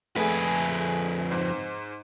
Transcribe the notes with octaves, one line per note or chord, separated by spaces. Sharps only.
F2 A3 G#4 B4 G#5
G#2 C5